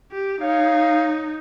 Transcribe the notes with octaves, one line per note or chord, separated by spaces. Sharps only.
G4
D#4 C#5 F5